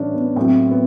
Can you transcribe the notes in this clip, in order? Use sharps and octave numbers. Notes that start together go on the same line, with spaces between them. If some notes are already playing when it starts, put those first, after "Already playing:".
Already playing: A2 E3 G3 C#4 D4
B3
A2 F#3 C4
B3